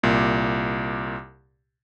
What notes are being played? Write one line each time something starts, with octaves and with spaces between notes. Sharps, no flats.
C2 A#2